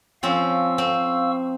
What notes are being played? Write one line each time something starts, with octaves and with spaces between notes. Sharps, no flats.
F3 C4 C#4 F5 C#6 E6
C4